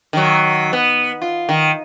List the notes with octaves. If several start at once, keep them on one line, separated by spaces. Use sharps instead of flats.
D#3 F#3
B3
F4
D#3